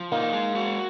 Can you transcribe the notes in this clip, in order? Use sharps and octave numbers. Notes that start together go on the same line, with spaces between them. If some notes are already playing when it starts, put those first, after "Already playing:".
Already playing: F3
A#3 D#4
G#3
F#4